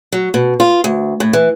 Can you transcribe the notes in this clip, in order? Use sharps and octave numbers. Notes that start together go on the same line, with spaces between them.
F#3
B2
F4
D2
A2
E3